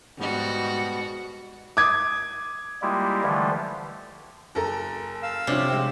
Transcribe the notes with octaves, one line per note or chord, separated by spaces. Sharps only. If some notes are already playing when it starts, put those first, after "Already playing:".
G#2 B2 G3 B3 F#4
D6 D#6 G#6
G3 G#3 A#3 E4 F4 G4
D3 E3 F3 G3 A3
F#1 A4 A#4
F5 E6
C3 F3 C#4 D4
G#3 C4